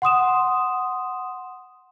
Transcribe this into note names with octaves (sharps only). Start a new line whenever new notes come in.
F#5 C6 D#6 E7